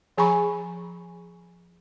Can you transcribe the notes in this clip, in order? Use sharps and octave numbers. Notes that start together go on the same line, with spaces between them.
F3 G#4 G#5 A#5 B5 C#6